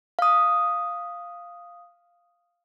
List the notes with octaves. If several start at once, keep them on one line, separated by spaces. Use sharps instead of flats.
F5 D#6